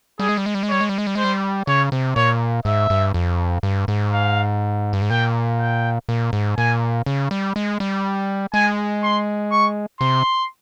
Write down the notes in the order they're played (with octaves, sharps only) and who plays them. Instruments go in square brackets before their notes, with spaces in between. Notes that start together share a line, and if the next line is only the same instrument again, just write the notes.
[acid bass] G3 [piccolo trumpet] G#4
[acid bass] G#3
G3
G#3
G3
G#3
[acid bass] G3 [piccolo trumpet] C#5
[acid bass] G#3
G3
G#3
G3
[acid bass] G#3 [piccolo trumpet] C5
[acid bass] G3
[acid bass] C#3 [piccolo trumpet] C#5
[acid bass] C3
[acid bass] A#2 [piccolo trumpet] C#5
[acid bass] G#2 [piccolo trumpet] E5
[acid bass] G2
F2
G2
G#2
[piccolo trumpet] F5
[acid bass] G2
G#2
[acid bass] A#2 [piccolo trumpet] G5
[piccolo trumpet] G5
[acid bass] A#2
G#2
[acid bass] A#2 [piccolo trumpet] G#5
[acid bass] C#3
G3
G#3
G3
[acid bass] G#3 [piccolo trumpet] G#5
[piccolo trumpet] C6
C#6
[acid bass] C3 [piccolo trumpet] C6